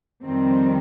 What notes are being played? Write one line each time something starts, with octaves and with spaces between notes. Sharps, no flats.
F2 D#3 G3 C4